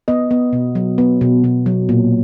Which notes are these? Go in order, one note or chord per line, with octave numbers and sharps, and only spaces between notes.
B3 D#5
B3
B2
F#3
B3
B2
B2
F#3
A#2